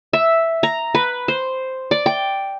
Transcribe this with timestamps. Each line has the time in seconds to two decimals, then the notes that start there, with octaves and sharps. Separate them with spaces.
0.13 E5
0.63 A#5
0.95 B4
1.28 C5
1.91 D5
2.06 G5